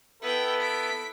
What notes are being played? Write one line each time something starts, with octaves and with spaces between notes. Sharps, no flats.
B3 E4 A4 B4 G5
B6 D7